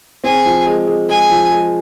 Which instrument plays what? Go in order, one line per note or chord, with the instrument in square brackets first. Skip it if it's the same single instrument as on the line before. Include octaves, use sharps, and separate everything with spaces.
[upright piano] C4 [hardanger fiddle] G#4
[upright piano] F3
G#3
G#3
[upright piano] G#3 [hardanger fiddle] G#5
[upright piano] F3
G#3